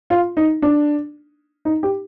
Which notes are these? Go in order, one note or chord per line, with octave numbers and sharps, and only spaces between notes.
F4
D#4
D4
D#4
G4